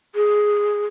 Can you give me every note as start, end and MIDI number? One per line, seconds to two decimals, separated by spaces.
0.15 0.85 68